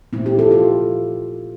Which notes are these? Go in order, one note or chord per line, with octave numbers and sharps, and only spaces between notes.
A#2 A3 C4 E4
E4 G4
F4 A4
F4 A4